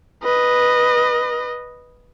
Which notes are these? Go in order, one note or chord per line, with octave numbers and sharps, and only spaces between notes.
B4 D#5